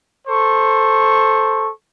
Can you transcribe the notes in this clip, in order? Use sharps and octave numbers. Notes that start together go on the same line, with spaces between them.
A4 C5 C#6